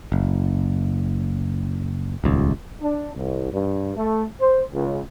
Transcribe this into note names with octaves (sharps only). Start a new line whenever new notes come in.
F#1
D#1 C#2
D4
C2
G2
A3
C5
C#2